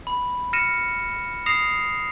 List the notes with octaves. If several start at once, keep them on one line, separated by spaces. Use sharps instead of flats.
B5
F6 A#6 C#7 D#7 E7
D#6 A#6 C7 E7 F7